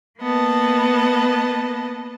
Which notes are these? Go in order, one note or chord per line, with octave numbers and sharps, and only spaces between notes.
A#3 B3 D#5 A5